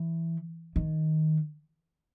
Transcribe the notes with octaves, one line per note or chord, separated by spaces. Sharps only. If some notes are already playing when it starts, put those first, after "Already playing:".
Already playing: E3
D#3